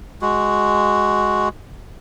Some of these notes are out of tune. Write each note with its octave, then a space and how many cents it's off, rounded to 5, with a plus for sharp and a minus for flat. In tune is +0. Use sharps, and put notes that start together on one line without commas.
G#3 +0 F#4 +0